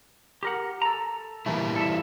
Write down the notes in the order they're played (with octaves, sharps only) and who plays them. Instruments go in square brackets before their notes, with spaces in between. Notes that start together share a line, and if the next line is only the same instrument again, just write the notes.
[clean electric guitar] G4 A#4 F#5
A4 A#5
[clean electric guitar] A#2 A3 [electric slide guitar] E3 G3 E4
[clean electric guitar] A4 E5